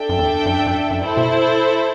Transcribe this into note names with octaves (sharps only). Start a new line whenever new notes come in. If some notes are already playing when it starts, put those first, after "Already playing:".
Already playing: D4 A4 E5 G5
F#2
E2
F#2
G2
F#2
F#2
G2 E4 A4 C5
B2